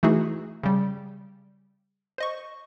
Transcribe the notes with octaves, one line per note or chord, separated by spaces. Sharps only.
E3 A3 D#4 E4 F#4 G#4
C#3 G3
C5 D#5 C#6